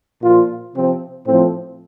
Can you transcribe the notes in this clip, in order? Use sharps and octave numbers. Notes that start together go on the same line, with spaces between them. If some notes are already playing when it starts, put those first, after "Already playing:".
A#2 F3 F4
C3 F3 C4
A2 F3 C4